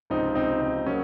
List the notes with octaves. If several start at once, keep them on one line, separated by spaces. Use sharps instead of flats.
C#2 C3 F3 C4 D#4
C4 D#4
C4
C#3 F#3 A#3 C#4